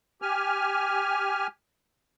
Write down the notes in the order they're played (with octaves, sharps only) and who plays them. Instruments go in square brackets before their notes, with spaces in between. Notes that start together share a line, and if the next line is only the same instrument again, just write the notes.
[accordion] G4 G#5 F6